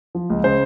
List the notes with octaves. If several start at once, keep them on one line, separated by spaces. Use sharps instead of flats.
F3
C#2
C#3 C5